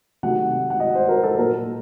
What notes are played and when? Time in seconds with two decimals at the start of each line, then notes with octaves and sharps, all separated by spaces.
0.23 C3 D#3 F#3 A3 F#5
0.70 F#5
0.80 D#5
0.95 C5
1.08 A#4
1.23 A4
1.38 A#2 F#3 A#3 A#4